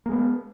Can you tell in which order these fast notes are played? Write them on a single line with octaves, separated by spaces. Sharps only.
A#3 G#3 B3